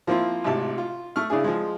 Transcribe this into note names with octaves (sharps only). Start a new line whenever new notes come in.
F3 A#3 C4 E4 F4
G#1 A2 C3 E5 A5
F4
A3 C#6 F6
C#3 D4 E4 G#4
F3 G#3